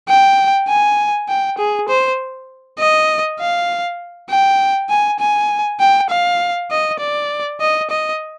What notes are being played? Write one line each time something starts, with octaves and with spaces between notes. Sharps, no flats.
G5
G#5
G5
G#4
C5
D#5
F5
G5
G#5
G#5
G5
F5
D#5
D5
D#5
D#5